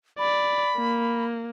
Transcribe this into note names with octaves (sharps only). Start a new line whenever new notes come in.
D5 B5
A#3